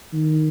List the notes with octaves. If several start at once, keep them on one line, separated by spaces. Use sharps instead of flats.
D#3